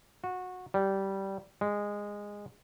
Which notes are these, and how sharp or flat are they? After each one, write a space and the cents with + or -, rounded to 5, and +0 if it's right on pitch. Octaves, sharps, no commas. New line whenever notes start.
F#4 -20
G3 -15
G#3 -15